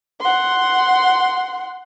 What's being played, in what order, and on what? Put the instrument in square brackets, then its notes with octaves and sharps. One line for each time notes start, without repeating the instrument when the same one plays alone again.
[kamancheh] F#5 C6